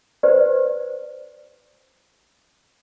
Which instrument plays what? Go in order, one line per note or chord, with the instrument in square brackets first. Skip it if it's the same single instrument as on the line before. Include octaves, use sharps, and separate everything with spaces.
[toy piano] G4 B4 C5 D5